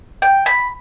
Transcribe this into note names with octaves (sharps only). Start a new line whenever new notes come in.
G5
B5